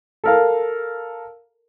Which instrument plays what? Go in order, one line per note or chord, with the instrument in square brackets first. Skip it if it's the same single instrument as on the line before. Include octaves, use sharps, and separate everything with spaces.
[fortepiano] A4 A#4 F5